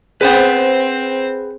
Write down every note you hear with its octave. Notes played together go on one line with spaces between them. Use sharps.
C4 G#4 B4 C5 F#5